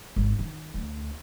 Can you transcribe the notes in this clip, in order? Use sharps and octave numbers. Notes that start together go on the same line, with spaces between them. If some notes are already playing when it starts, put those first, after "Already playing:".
G#1
D#3
D2